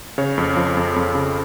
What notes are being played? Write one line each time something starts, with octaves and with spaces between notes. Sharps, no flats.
C#3 C#5
F2
F3
F2
F2
C#3